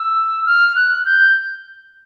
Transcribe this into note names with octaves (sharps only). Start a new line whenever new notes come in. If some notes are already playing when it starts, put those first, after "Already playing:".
Already playing: E6
F6
F#6
G6